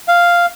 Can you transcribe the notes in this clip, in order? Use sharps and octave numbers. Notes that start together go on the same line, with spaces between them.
F5